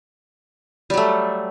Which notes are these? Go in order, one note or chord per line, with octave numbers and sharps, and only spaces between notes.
F#3 G3 A3